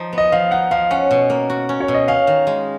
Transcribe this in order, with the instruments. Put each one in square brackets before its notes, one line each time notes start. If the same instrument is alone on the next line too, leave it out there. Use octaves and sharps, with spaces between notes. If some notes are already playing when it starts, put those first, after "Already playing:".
Already playing: [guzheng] F3 D#4
B3
[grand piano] D#5
[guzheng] F3 [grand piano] F5
[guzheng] D#4 [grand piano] F#5
[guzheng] F3 [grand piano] F5
[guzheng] C#4 [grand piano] F#5
[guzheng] B2
A#3
F#4
C#4
[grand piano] C#5
[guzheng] B2
[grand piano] D#5
[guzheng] C#4 [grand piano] F5
[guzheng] D#3
G#3